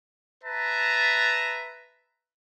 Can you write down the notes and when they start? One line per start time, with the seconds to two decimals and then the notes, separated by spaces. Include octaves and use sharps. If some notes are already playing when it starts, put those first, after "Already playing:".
0.44 B4 E5 A5 A#5